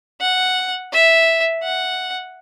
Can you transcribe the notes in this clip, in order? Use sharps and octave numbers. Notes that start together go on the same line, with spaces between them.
F#5
E5
F#5